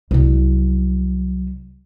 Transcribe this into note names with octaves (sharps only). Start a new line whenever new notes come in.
C2 F#3